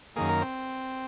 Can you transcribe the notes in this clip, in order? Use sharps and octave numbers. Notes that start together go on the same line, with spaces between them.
F#2 D#3 A#3 G#4
A#4
C4